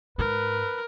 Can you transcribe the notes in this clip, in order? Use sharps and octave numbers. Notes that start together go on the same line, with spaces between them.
G#2 A#4 B4